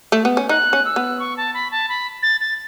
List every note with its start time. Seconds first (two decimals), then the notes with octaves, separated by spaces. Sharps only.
0.12 A3
0.25 B3
0.37 C#4
0.49 D#4 F#6
0.73 C#4
0.85 E6
0.96 B3
1.20 C#6
1.37 A5
1.54 B5
1.71 A5
1.89 B5
2.23 A6
2.41 A6